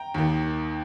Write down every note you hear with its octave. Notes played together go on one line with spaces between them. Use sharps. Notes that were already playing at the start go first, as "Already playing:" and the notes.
Already playing: G5 A#5
D#2 D#3